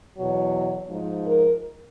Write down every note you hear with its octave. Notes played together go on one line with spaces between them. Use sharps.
E2 B2 F#3
G#2 F3
A#4